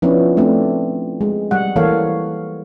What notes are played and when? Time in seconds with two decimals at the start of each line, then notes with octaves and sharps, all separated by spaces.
0.02 F3 B3 C#4 D4 E4
0.37 A3 C4 D4
1.21 G#3
1.51 G3 F#5
1.76 E3 A#3 A4 C#5 F5